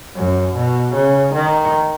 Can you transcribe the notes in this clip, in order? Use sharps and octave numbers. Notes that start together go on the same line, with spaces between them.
F#2
B2
C#3
D#3